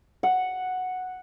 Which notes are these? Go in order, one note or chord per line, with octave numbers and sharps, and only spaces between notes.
F#5